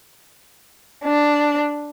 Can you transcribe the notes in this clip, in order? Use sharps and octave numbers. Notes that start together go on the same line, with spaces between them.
D4